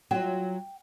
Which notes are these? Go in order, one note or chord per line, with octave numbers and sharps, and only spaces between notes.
F#3 F4 G5